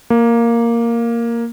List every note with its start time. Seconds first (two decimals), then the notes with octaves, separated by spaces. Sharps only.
0.10 A#3